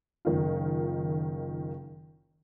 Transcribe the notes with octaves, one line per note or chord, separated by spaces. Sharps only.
F#1 D#3 F4